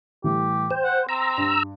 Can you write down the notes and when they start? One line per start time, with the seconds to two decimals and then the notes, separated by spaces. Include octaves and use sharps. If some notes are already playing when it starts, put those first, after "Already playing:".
0.24 A2 E3 G3 G4
0.71 C5 G5
0.84 F#5
1.09 C4 A#5 E6
1.37 G2